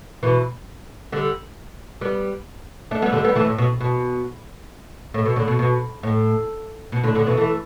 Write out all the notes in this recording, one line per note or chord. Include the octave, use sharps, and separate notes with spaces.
B2 E3
D3 G3
G3 B3
A3 D4
G3 B3
D3 G3
G3 B3
E3 A3
A2
B2
B2
A2
B2
A2 D3
B2
B2
A2
B2
A2 D3
A2 D3
B2 E3
E3 A3